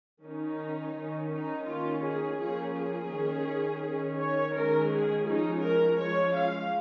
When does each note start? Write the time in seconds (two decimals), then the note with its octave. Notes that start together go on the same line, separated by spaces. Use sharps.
0.23 D#3 C#4 D#4
0.96 D#3 C#4
1.31 D#4
1.67 D#3 A#3 C#4 F4
2.03 G#4
2.39 F3 A#3 C#4 G#4
2.75 G#4
3.12 D#3 C#4
3.83 D#3 C#4
4.20 C#5
4.55 D#3 G#3 C#4 A#4
4.91 G#4
5.27 F3 G#3 C#4 D#4
5.63 A#4
5.99 F3 G#3 C#4 C#5
6.36 F5